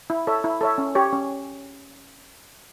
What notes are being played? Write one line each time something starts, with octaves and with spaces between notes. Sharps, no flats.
E4
A4 C#5 E5
E4
A4 C#5 E5
C#4
G4 C#5
C#4